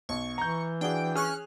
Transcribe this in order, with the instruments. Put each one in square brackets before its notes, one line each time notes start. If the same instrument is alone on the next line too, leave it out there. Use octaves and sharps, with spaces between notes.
[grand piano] B1 [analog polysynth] C#6
[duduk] E3 [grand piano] A#5 G6
[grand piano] D4 F#4 G#4 [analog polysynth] G5
[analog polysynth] C#4 F6 F#6 [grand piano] G#4